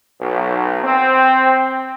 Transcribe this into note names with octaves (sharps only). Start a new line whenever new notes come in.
B1
C4